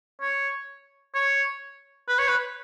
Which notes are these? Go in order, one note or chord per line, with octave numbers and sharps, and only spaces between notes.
C#5
C#5
B4
C#5
B4